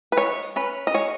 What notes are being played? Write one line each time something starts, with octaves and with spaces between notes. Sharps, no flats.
B4
G#3 C#5
C#4 B4
D#5
G#3 C#5